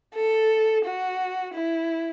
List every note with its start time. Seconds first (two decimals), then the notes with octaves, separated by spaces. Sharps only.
0.15 A4
0.85 F#4
1.54 E4